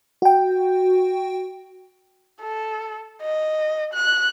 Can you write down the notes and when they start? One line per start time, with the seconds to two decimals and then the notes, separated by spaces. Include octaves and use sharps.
0.22 F#4 G5
2.41 A4
3.22 D#5
3.94 F#6